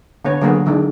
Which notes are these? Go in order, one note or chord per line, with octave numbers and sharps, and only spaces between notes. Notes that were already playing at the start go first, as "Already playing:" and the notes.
D3 B3 C#5
D3 F#3 A#3 B3 F#4 G#4
D3 D#3 G#3 D4